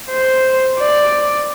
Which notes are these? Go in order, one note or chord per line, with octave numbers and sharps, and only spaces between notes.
C5
D5